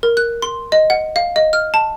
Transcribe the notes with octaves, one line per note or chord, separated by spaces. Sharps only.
A#4
F#6
C6
D#5
F#5
F5
D#5
F6
A5